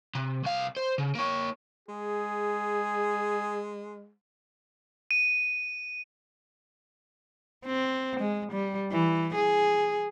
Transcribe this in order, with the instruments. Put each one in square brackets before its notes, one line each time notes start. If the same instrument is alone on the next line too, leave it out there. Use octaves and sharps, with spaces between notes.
[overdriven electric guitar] C3
C2 F5
C5
C#3
A#3 C#5
[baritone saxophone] G#3 [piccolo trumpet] G#4
[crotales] D#7
[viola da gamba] C4
G#3
G3
E3
G#4